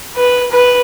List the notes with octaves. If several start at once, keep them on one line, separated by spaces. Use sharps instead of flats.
B4
B4